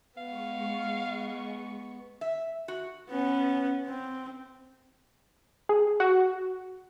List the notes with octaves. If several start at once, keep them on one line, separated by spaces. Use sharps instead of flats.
G#3 B3 F5 C#6
E5
F#4
B3 C#4
C4
G#4
F#4